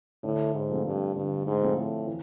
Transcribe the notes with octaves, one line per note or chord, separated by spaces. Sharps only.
A2 D3
G#2
F3 A3 C4
G2
G2 D3
G#2
F3 A3 C4
A2
E3